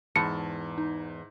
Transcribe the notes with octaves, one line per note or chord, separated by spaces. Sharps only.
E2 G#2 A5 C#7
D#4